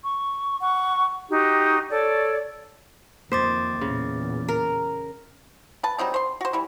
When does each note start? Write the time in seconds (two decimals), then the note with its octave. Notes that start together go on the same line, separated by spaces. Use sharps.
0.04 C#6
0.61 F#5 C#6
1.29 D#4 F#4 G4
1.89 A4 C#5 D5
3.32 F2 D#3 A#3 C5 D6 A6
3.81 E2 A#2 C#3
4.49 A#4
5.83 B4 A5
5.98 F#3 G3 C4 D#4
6.14 C5 C6
6.41 F#4 C5
6.53 E3 G3 E4